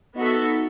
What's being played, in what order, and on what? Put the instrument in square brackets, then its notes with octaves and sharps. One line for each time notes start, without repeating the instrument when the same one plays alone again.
[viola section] B3 F#4 A4 E5 [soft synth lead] D#4